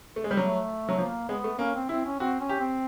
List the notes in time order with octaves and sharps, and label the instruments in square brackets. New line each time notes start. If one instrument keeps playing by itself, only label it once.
[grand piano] A3
G#3
G3
[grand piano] F#3 [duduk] A3
[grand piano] F#3
[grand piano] F3 [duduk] A#3
[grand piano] G#3 [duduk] B3
[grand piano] A3
[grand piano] A#3 [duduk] C#4
[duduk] C4
[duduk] C4 [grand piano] E4
[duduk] C#4
[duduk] C4 [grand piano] F#4
[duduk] C#4
[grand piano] G4
[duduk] C4